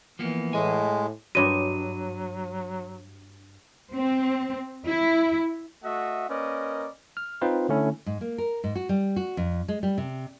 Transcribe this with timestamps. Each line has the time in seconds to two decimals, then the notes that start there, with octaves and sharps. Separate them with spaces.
0.19 E3 F3 A#3 B3
0.53 A2 G#3 D#5 G#5
1.35 G2 F#3 F#4 C#5 D#5 D6 D#7
3.93 C4
4.87 E4
5.84 A3 F#4 D#5 E5 F#5
6.29 A#3 C#4 A#4 B4 D5 D#5
7.17 F6
7.41 C4 D#4 F4 B4 C5
7.69 D3 A3 C#4 E4
8.06 G#2
8.21 A#3
8.38 A#4
8.64 G#2
8.75 F#4
8.89 G3
9.16 F#4
9.37 F2
9.68 G#3
9.83 G3
9.98 C3